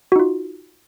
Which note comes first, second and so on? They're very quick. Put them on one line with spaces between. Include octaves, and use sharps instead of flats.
F#4 D#4 F4